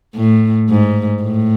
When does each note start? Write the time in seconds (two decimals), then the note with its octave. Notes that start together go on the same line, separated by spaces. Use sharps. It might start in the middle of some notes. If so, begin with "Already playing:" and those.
0.15 A2
0.69 G#2
1.23 A2